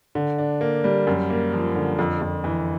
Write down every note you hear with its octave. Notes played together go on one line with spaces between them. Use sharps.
D3
D4
A#3
G3
F#2
A#3
F3
D3
F2
F2
E3